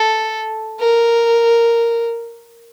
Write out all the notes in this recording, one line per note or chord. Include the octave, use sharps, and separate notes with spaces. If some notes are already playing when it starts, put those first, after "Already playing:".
Already playing: A4
A#4